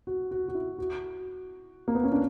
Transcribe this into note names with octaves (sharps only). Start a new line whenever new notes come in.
F#4
F#4
F#4
E4
F#4
A#3
B3
C#4
D4